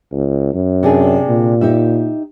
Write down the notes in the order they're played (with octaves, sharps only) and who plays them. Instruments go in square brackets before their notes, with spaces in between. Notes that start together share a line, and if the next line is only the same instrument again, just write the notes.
[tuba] C#2
F#2
[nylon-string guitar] C3 D4 G#4
[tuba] A#2
[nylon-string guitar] D#4 G4 E5